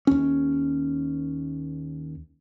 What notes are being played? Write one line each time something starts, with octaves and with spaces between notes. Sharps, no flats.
D#2 C#4